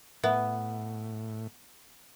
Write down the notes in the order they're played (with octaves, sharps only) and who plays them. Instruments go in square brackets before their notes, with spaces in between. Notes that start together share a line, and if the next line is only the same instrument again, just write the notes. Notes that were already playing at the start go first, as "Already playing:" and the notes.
[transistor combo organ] A2 [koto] B3 [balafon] E5